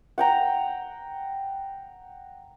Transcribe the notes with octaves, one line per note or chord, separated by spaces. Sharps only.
F#5 G5 A#5